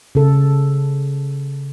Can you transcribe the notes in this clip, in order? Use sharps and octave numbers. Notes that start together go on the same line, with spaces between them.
C#3 A4